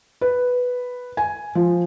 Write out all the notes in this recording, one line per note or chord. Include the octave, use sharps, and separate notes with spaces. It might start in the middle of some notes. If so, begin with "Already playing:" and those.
B4
G#5
F3